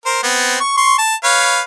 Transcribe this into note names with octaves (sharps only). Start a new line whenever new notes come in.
A#4 C5
B3 C4
C#6
C6 C#6
A5
B4 C#5 F5